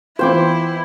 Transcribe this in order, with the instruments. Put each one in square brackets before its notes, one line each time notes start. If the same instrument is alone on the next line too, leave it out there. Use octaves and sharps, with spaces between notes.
[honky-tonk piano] E3 B3 F4 [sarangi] E4 [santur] C5 G5 D6